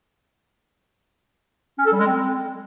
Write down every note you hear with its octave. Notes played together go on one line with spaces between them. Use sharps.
C#4
A4
G3
G#3
C4